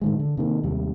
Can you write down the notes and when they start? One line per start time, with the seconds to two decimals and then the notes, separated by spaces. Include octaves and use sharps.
0.01 A2 D#3 G#3
0.19 D3
0.37 C3 D#3 A#3
0.63 D#2 C3 G3